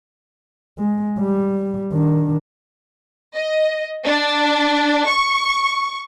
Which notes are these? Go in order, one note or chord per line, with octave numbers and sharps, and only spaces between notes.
G#3
G3
D#3 D4
D#5
D4
C#6